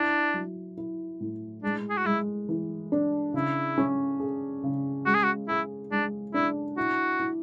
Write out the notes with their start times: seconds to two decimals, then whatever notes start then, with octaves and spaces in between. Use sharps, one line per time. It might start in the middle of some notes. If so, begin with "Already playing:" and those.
Already playing: D4 E4
0.34 F#3
0.77 E4
1.20 A2
1.63 G#3 D4
1.90 G#4
1.98 F#4
2.05 G#3 E4
2.49 E3
2.92 D4
3.34 C#3 E4
3.78 C#4
4.20 G#4
4.63 C#3
5.06 G#3 F#4
5.15 G#4
5.24 F#4
5.48 E4 G#4
5.91 G#3 D4
6.34 D4 E4
6.77 E4 F#4
7.20 E4